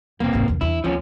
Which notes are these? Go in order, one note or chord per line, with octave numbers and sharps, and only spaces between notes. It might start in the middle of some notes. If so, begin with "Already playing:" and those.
E1 A#3 C4
F1 G#2
F1 F2
E2 D4 E4
D2 F3 C4 C#4